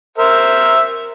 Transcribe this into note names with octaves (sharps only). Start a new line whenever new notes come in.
A#4 C5 E5